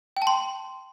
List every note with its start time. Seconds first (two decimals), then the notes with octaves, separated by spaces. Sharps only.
0.17 G5
0.22 A5
0.27 C6